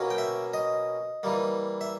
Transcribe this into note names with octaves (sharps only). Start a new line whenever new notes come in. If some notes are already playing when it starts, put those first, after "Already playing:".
Already playing: B2 A#3 C#4
G5
E5
D#5
E3 G3 A#3
E5